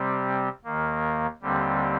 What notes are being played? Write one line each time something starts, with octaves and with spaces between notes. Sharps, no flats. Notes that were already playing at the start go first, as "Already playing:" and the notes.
Already playing: C3 G3 C4
D#2 D#3 A#3
D#2 D3 G3 C4